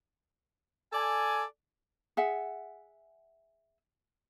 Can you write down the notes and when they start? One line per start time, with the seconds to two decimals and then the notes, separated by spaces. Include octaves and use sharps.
0.93 A4 D5 G#5
2.17 G#4 E5 F#5